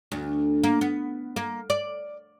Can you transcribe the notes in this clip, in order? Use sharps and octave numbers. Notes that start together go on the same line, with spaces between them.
D2
A#3
B3
A#3
D5